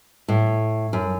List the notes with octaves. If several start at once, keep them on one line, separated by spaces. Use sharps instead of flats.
A2
F#2